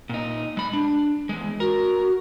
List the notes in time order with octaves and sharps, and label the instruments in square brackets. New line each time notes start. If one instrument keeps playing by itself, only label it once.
[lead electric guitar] A#2 D#4
G#3 B5
D4
E2 G#3
[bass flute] F#4 [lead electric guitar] A#4